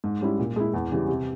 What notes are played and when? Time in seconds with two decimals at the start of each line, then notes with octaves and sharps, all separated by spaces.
0.04 G#2
0.21 G3 C#4 E4
0.39 A#2
0.56 G#3 E4
0.73 E2
0.91 C#3 E3 G3
1.08 C3